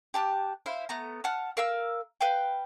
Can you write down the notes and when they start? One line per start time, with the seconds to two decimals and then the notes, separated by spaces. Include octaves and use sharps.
0.14 G4 A5 F#6
0.66 E4 C5 F5
0.89 A3 B3 A#5
1.24 F#5 A5 F6
1.57 A#4 F5 E6
2.21 B4 F5 G5